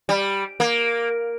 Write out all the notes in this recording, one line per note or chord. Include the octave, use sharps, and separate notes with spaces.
G3
A#3